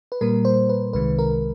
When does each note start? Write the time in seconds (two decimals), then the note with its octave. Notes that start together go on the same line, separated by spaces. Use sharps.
0.12 B4
0.21 A#2 G3 A#3 A#4
0.45 C5
0.69 B4
0.93 C2 C3 D#3 G#3 B4
1.19 A#4